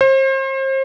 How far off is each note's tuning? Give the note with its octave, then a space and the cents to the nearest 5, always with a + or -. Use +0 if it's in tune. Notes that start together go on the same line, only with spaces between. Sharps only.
C5 +35